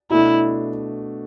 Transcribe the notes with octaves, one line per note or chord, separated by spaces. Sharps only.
B2 A3 D4 E4